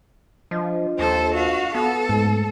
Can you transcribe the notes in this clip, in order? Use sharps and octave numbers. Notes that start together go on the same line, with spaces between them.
F3 D4 F4 D#5
D#2 A4 C5
F#4 F5
B3 A4
G#2 A3